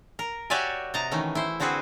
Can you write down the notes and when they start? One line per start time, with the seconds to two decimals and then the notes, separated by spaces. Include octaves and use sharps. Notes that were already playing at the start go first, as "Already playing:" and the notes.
0.19 A#4
0.50 F#4 G4 C#5 D5 E5 G#5
0.94 C3 D#5 A5 A#5
1.11 D#3 E3 A3 C#4
1.35 E4 C5
1.60 D3 C4 F#4 G#4 B4 C5